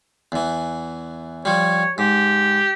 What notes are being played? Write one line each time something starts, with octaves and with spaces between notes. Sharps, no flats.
E2 E3
F3 G3 C#5
G#2 G4